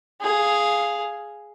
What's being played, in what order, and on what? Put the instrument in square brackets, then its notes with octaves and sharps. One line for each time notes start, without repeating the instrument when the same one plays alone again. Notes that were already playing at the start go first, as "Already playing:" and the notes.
[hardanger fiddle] G#4 F5